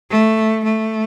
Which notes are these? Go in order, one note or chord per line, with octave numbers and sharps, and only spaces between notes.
A3
A3